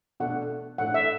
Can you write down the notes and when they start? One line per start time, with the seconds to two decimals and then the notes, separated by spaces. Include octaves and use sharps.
0.20 B2 A3 D4 F#5
0.78 A2 A3 D4 F#5
0.94 E5